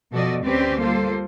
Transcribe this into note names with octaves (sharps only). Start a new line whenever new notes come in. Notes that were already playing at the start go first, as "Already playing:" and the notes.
B2 F3 F#4 A4 D5 D#5
D2 C4 C#4 G4 B4 D5
G3 A#3 F4 A4 C5